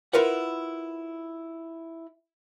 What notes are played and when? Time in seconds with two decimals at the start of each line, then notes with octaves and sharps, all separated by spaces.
0.13 E4 F4 A#4 B4 F#5